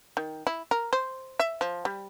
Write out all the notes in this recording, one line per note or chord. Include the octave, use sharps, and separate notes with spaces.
D#3
E4
A#4
C5
E5
F3
G3